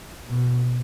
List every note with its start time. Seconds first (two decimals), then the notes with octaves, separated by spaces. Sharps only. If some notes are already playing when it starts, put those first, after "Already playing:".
0.28 B2